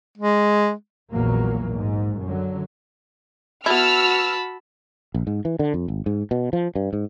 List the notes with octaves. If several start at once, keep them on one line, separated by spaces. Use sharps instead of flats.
G#3
A#1 E2 A#2 F#3 A#3
G#2
F#2 D3 F#3
B3 E4 F#4 A5 B5 E6 F6
A#1
G#2
E3
D3
F2
G#1
G#2
B2
F3
G2
G#2